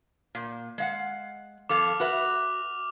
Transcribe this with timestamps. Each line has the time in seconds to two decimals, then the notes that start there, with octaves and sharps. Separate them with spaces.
0.35 A#2
0.78 G#3 F5 F#5
1.69 F2 A4 F5 D6 F6 F7
2.00 F#4 B4 E5